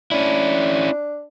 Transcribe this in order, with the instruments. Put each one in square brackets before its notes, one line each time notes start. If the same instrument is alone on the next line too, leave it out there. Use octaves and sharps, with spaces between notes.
[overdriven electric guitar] C#4 E4 [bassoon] D4